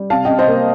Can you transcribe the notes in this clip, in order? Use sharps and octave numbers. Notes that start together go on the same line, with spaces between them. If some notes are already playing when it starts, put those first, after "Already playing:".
Already playing: G3
C3 F5 A5
C3 D#5 G5
C5 D#5
A#3